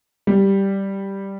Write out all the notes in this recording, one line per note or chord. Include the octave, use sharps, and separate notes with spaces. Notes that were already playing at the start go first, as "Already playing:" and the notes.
G3